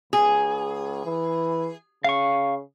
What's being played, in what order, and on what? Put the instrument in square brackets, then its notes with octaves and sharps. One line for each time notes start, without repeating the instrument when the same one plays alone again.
[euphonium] C#2 [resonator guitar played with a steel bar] G#4
[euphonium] E3
[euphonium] C#3 [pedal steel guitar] F5 C#6